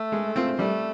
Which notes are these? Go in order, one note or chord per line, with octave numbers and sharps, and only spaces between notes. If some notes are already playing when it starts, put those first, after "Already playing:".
Already playing: A3
G#3
C4 F4
G3 A3